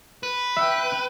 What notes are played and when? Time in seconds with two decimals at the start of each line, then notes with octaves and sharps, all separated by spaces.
0.23 B4
0.57 E5 G5